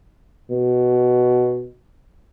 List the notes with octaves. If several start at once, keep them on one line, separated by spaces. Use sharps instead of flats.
B2